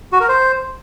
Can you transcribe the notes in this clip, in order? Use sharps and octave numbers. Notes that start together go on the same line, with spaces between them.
F#4
A#4
C5